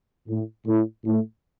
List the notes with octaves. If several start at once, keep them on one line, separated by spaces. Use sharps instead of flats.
A2
A2
A2